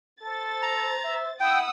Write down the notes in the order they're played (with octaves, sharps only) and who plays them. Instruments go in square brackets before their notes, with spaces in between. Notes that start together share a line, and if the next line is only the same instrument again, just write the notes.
[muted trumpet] A4 [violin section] C5 A6
[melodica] A#5
[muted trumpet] E5
[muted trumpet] E4 [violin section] F#5 D#6 E6 [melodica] G5